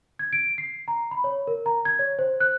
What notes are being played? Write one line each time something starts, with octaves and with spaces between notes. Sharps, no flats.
G#6
D7
C7
A#5
B5
C#5
A#4
A#5
G#6
C#5
C5
F#6